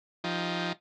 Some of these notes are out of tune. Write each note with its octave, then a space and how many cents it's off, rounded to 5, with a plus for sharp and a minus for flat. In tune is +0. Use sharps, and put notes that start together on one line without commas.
F3 +0 D#4 +10 G4 +0